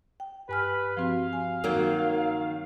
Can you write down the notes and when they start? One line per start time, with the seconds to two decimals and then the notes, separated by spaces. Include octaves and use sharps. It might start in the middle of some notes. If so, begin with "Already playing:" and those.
0.20 G5
0.49 G2 B4 G#5 F6
0.97 F3 C4 F#4 F5
1.33 G#5
1.64 D#3 F#3 A#3